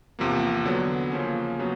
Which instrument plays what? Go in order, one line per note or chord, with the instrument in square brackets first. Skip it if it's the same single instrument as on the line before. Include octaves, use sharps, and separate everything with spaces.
[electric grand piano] E2 C3 F3 A#3
D3 F#3 B3
C#3 F3 A#3 C#4
C#3 F#3 B3